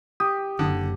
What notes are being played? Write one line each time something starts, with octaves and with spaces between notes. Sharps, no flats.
G4 D#6
F#1 D3